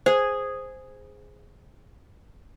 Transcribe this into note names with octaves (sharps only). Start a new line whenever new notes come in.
G#4 C5